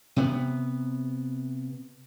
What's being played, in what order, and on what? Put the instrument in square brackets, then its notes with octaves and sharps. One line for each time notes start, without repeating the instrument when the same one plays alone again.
[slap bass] C3 B3